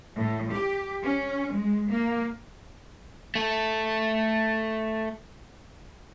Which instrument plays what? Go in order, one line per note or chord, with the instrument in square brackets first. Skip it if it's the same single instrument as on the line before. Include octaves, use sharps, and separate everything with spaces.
[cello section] A2
G4
C#4
G#3
A#3
[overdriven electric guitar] A3 A4